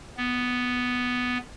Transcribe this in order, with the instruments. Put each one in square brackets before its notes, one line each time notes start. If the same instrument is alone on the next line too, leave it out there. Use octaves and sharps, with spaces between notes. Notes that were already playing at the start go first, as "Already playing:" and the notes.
[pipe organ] B3